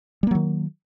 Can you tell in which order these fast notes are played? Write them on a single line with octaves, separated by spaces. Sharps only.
G3 A#3 F#3 D#3